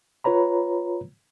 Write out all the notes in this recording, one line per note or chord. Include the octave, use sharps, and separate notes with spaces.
F4 B4 C#5 A#5 B5